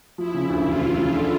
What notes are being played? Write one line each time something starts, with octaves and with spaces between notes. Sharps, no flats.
F3 E4
C#3
D2
E1 F4
F3
C#3
D3